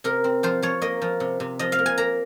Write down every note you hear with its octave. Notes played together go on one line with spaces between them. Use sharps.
C3 A#4
C4
F3 C5
F3 C#5
A#3 D#5
F3
C3
C3
F3 D#5
F5
A#3
G#5
A#3 A#5